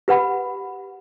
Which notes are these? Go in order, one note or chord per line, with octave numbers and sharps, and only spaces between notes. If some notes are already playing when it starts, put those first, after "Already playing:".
G4 B4 F#5 B5